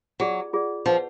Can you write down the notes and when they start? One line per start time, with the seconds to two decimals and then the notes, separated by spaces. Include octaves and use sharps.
0.20 F#3 F4 G#4 D5
0.53 F4 G#4 D5
0.86 F3 B4 F#5 A5